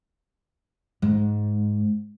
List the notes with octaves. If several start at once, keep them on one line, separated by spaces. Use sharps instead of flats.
G#2